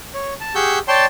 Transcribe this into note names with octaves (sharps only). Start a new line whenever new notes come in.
C#5
A5
G4 G#4 F#5 C#6 E6 G6
C#5 D5 G5 A5 C6